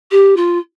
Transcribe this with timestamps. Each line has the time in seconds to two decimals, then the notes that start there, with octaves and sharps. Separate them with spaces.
0.11 G4
0.36 F4